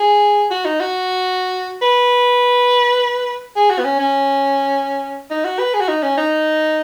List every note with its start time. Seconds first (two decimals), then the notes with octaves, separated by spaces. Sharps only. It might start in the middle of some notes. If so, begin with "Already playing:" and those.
Already playing: G#4
0.51 F#4
0.65 D#4
0.80 F#4
1.82 B4
3.56 G#4
3.70 F#4
3.79 B3
3.85 C#4
3.99 C#4
5.30 D#4
5.45 F#4
5.59 B4
5.74 G#4
5.81 F#4
5.88 D#4
6.03 C#4
6.17 D#4